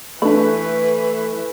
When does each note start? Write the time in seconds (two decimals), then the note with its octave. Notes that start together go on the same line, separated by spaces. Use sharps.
0.22 E3 A3 D4 B4 B5